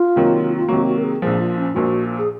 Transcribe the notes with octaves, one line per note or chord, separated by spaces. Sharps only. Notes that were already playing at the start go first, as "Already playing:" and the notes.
Already playing: F4
C3 D#3 F#3 A#3
F4
C3 D#3 F#3 A#3 F#4
F#4
A#4
G#4
A#1 A#2 F3 G#4
F4
C#4
A#1 A#2 F3 F#4
G#4